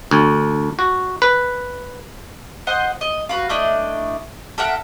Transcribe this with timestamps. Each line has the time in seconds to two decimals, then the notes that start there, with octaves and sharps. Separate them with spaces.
0.11 D2
0.79 F#4
1.22 B4
2.67 C5 D#5 F#5 C6
3.01 D#5
3.29 F#4 B4 F5
3.49 A3 D4 E4 D#5
4.58 A4 A#4 E5 F#5